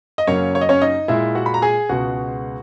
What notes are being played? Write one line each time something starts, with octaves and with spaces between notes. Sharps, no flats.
D#5
F#2 C#3 F#3 A#3 C#4 C#5
C#5
D#5
C#4 C#5
D#4 D#5
A#2 G#3 E4 E5
F#4 F#5
B5
A#5
G#4 G#5
C#2 B2 G#3 F#4 F#5